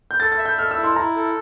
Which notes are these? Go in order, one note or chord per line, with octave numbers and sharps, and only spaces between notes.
G6
A4 A6
A6
E5
G6
A4 F6
E6
E4
C6
E4 A#5
A4